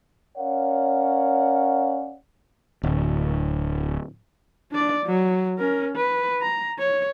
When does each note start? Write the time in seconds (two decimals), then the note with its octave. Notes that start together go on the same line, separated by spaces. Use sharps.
0.37 C#4 A#4 C#5 D5 F5 F#5
2.83 D1
4.71 D4 D5
5.06 F#3
5.58 C#4 A#4
5.96 B4
6.42 A#5
6.79 C#5